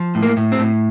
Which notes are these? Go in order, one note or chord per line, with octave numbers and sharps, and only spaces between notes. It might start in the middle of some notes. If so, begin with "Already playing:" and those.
Already playing: F3
A2
A#3
A2
C4
A2